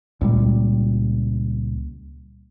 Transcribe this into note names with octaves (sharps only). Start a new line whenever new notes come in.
C#2 A#2 G3